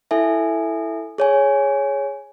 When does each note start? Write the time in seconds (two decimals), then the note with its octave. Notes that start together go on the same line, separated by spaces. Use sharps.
0.11 E4 A4 E5 G#5
1.18 G#4 C#5 G#5